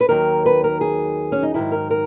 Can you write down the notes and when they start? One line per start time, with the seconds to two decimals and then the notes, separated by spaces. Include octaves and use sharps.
0.01 B4
0.09 D#2 D#3 F#3 A#4
0.46 B4
0.64 A#4
0.81 G#4
1.32 C#4
1.43 D#4
1.54 G#2 D#3 F#3 E4
1.72 A#4
1.91 A#4